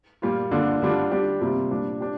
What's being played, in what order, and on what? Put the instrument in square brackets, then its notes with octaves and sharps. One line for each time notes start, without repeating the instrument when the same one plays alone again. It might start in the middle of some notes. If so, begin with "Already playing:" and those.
[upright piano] A#2 G3 A#3 F4
D3 A#3 D4 F4
D3 G3 D4 F4
G3 D4 G4
C3 G3 A#3 F4
A#2 G3 D4
D4 G4